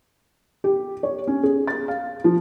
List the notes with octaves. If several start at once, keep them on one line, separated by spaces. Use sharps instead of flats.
G4
C#5
C#4
G#4
A6
F5
F3